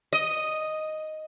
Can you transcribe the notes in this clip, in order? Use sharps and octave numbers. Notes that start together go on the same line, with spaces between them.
D#5